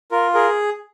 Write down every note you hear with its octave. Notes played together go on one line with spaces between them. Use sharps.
F4 A#4
G#4 A#4